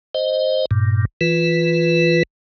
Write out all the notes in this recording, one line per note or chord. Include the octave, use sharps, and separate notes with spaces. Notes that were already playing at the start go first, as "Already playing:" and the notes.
C5 D#5
G2 A#2
E3 F4 B4